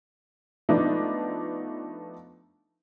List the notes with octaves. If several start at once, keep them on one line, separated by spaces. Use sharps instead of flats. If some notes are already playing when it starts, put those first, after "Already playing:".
F3 A3 B3 D4 D#4